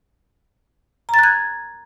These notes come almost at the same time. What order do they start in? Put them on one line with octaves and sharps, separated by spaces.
A#5 A6 F#6 G#6